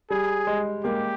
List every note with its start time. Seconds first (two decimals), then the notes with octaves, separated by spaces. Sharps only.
0.10 G3 G#4
0.47 G#3
0.84 G#3 A#3 G4